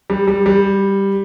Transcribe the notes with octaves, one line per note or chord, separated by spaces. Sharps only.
G3
G3
G3